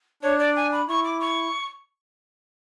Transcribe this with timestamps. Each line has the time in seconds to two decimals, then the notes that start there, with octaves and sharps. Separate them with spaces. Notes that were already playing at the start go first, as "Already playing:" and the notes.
0.23 D4 C#5
0.39 D5
0.56 G#5
0.72 B5
0.89 E4 C#6
1.04 D6
1.20 C#6